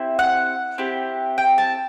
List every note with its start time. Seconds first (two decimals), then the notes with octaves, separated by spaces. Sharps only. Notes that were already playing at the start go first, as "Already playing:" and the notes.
Already playing: C4 E4 G4
0.19 F#5
0.78 C4 E4 G4
1.38 G5
1.58 A5